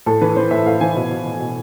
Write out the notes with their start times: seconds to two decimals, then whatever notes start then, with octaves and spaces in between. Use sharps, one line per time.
0.06 A2 A4
0.21 E3 B4
0.36 E3 C5
0.51 A2 E5
0.66 A2 F5
0.81 E3 G#5
0.96 B2
1.11 B2
1.26 B2
1.40 B2